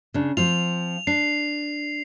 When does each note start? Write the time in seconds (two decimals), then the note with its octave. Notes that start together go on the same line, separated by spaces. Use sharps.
0.14 C#3 D4
0.37 F3 C4 F4 F7
1.07 D4 C7